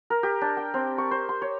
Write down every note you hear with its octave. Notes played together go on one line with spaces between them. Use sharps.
A#4
G4
D4
G5
C4
C#6
C5
C6
C#5